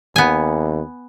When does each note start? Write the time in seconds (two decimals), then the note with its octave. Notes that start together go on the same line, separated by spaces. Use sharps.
0.16 D#2 B3 G#5